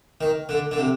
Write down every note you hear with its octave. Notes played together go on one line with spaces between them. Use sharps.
D#3
D3
D3
C3